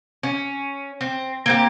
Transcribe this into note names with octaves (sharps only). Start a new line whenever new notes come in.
C#4
C4
A#3 C4 G4